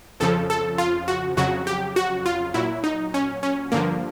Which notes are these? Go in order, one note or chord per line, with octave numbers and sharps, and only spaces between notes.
F2 C#3 F3 A4
A4
F4
F#4
F2 C#3 F#3 F#4
G4
F#4
F4
A#2 F#3 E4
D#4
C#4
C#4
G2 D3 F3 A#3